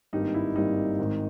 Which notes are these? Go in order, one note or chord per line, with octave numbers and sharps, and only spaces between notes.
G#1 G2 G3 A#3 D#4
E4
G#1 G2 G3 A#3 D#4
G#1 G#2 D#3